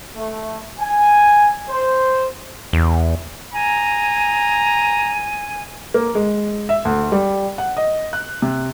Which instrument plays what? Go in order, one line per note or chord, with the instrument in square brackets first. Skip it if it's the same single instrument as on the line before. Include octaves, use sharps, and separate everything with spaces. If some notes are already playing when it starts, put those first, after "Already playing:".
[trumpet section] A3
G#5
C5
[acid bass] E2
[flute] G#5 [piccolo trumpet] A#5
[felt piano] A#3
G#3
E5
D2
G3
F#5
D#5
F#6
C3